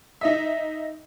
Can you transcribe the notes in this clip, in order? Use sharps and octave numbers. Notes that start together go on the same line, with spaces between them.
D#4 D#5 E5